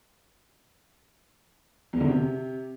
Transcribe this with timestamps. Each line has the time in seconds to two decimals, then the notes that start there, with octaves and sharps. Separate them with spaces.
1.93 E2
2.01 D3
2.08 C3